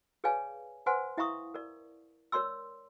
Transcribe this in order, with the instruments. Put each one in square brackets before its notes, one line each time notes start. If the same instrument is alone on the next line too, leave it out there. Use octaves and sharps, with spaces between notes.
[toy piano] G#4 B4 C#5 D5 F5 G#5
B4 C5 F#5 G#5 C6
E4 E5 F5 A#5 C#6 D#6
A#4 D5
A#4 C#5 D5 C6 E6